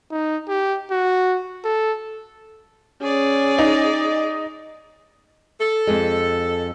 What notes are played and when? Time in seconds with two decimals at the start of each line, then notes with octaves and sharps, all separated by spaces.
0.11 D#4
0.48 G4
0.91 F#4
1.65 A4
3.02 C#4 G#4 D5
3.58 D#4
5.60 A4
5.87 F2 G#3